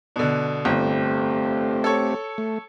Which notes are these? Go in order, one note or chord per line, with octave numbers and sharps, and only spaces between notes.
B2 D3
G1 A3 C4 G4
A4 C#5
A3